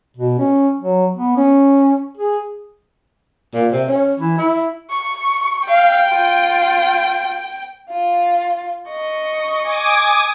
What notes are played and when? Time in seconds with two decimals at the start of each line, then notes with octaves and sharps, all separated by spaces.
0.17 B2
0.38 C#4
0.80 F#3
1.16 B3
1.36 C#4
2.17 G#4
3.54 A#2
3.72 C3
3.88 C#4
4.20 E3
4.38 E4
4.90 C#6
5.68 F5 G5
6.09 F4
7.90 F4
8.89 D#5 C#6
9.61 G#5 D6 D#6